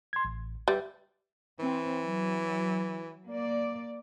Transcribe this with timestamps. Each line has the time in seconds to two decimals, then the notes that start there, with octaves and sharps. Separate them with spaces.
0.13 C6 G#6
0.25 A1
0.68 G3 B4 E5
1.59 E3 C4
2.02 F#3
3.25 A#3 D5